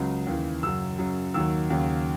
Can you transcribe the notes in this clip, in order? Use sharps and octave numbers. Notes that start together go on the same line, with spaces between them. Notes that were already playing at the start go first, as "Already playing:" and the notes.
Already playing: C#2 C#3 F#3
D#2 C#3 E3
F#2 C#3 F#3 E6
F#2 C#3 F#3
D#2 D#3 F#3 E6
D#2 C#3 F#3